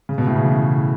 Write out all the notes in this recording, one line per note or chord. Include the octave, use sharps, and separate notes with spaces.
C#3
B2
A2
C#3
E3